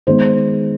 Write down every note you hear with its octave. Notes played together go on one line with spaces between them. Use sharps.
D#3 G#3 B3 C5